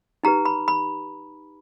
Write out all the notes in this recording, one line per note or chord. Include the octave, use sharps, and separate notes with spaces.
D#4 G4 B4 A#5
B5
B5